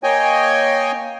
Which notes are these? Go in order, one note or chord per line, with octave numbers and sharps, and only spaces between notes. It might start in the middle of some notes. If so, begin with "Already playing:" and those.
A#3 C#5 D#5 G5 G#5